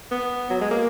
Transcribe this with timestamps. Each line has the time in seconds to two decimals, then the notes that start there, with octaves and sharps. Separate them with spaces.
0.11 B3
0.50 F#3
0.61 G#3
0.71 A#3